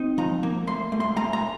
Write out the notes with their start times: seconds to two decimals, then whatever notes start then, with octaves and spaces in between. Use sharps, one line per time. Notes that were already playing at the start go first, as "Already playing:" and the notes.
Already playing: C4 D#4
0.18 F3 A#5
0.43 A#3
0.67 A3 C6
0.92 A3
1.00 C6
1.17 A3 A#5
1.33 A#5